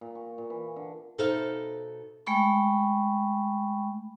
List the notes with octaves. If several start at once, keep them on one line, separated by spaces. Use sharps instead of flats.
A#2
C#6
A#2
E3
D3
B2 D#4 A4 C5 E5 F5
G#3 A3 G5 B5 C#6